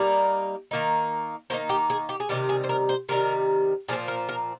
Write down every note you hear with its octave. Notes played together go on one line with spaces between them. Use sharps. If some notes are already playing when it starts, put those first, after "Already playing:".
Already playing: G3 A#3 D#4 D5
D#3 A#3 D#4
D#3 A#3 D#4 C5
G4
G#4
G4
G#4
C3 D#3 G3 G4
G#4
C5
A#4
C5
C3 D#3 G3 A#4
A#2 F3 C4 G#4
A#4
A#4